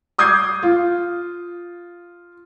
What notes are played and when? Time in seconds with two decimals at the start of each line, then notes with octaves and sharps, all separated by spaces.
0.18 D6 D#6 G6 G#6 C7
0.63 F4